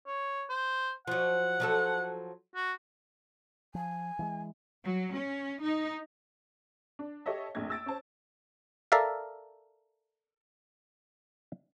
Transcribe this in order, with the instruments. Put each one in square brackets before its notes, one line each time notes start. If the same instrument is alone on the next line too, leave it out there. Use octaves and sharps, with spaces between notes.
[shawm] C#5
C5
[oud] F3 F#3 [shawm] F#5
[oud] F3 F#3 A4
[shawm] F#4
[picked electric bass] F3 [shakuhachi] G#5
[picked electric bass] E3 G3 G#3
[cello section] F#3
C#4
D#4
[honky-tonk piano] D4
G4 A4 C#5 D#5 E5
A#1 F2 A3 D4 G#6
E6 A6 D7
C#4 C5 A5
[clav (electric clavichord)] A4 A#4 D5 E5 F5